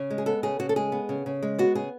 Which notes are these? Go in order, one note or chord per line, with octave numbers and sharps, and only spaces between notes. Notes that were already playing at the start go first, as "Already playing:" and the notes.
Already playing: C#3
G#3
G#4
B3 A4
C#3 G#4
C#3 F#4
A4
G#3 G#4
B3
C#3
C#3
G#3
B3 F#4
C#3 G#4